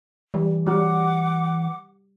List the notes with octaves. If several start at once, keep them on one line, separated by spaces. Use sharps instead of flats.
E3 G3
G3 F#4 F#5 D6